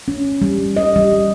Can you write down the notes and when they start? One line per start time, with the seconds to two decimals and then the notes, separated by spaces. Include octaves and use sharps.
0.08 C#4
0.42 G3
0.77 D#5
0.96 G3